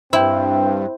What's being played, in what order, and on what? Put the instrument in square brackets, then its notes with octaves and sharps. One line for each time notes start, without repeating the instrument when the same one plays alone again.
[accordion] G2 [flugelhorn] C4 [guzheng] E4 [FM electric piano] C5 G5